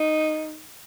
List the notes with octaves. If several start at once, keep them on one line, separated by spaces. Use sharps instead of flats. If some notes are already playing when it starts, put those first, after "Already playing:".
Already playing: D#4